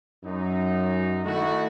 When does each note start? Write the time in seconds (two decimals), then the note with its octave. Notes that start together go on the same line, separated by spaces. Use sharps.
0.24 F#2 D#4
1.25 D#3 A3 D#4 E4 F#4